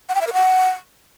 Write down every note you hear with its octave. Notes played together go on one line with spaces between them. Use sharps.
F#5
G5
E5
A#4
F#5